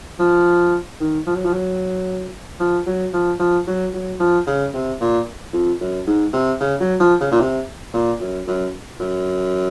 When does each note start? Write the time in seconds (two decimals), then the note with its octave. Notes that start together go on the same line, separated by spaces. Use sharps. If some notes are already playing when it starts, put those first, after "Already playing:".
0.19 F3
1.00 D#3
1.26 F3
1.35 F#3
1.45 F3
1.53 F#3
2.60 F3
2.87 F#3
3.13 F3
3.39 F3
3.67 F#3
3.94 F#3
4.20 F3
4.47 C#3
4.74 C3
5.01 A#2
5.53 F2
5.81 F#2
6.07 G#2
6.33 C3
6.60 C#3
6.80 F#3
7.00 F3
7.20 C#3
7.32 A#2
7.40 C3
7.94 A#2
8.20 F#2
8.47 F#2
9.00 F#2